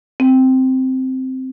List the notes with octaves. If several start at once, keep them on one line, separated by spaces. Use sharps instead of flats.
C4